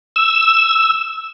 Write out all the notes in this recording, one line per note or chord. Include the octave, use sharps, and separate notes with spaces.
E6